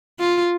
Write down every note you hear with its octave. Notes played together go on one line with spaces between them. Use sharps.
F4